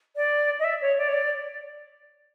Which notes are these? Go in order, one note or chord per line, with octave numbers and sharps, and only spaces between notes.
D5
D#5
E5
C#5
D5
C#5
D5